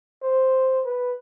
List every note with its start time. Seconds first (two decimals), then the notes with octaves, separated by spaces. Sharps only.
0.22 C5
0.84 B4